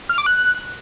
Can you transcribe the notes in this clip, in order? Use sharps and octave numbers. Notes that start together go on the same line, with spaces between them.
F6
D6
F#6